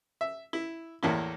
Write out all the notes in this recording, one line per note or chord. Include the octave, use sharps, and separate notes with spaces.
E5
E4
E2 A2 A#3 E4